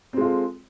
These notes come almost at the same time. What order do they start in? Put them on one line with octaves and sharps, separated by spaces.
C4 G#3 F4 A4